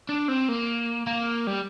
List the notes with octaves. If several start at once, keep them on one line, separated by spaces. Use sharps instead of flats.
D4
C4
A#3
A#3
G3